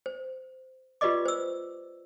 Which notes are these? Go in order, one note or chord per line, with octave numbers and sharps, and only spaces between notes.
C5
F4 G4 B4 D5 D#5 D6
C5 E6